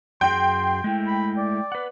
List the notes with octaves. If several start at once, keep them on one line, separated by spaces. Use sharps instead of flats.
F#2 F#4 G#4 G5 C6
G#3 A3 E4
B5
D5
B4 F#5